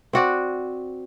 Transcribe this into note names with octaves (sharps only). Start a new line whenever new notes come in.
C4 F#4 D5